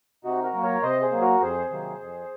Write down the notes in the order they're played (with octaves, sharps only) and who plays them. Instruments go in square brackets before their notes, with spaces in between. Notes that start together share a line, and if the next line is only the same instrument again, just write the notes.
[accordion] C3 D#4 F#4
F#4 A#4
F#3 A#3
A#4 C#5
C3 C5 D#5
G#4 C5
F#3 A#3
F#4 A#4
F2 G#4 C5
C3 D#3 F#3 A#3
F2